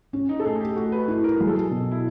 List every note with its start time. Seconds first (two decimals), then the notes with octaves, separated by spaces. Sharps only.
0.13 C#4
0.29 D#4
0.40 A4
0.45 A3 G#4
0.60 G4
0.76 A3 F#4
0.92 B4
1.08 E4
1.24 A#4
1.40 F#3 G#4
1.48 A4
1.55 G#4
1.71 B2
1.91 E4